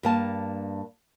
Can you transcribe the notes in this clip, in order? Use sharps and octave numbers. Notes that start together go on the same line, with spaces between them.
G2 A#3 A5